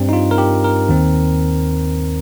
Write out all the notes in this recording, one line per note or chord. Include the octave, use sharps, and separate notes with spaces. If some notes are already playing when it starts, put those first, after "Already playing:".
Already playing: G2 G3 C4
D#4
F4
A#4
G4
A#4
D#2 D#3 C4